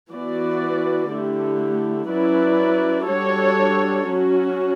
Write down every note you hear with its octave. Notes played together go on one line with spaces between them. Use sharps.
E3 B3 F#4 B4 D5
D3 A3 E4 G4
F#3 C#4 E4 B4 D5
G3 D4 F#4 A4 C#5
F#3 C#4 F#4